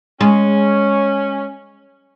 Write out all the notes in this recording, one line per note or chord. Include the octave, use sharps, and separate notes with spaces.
G#3 C#4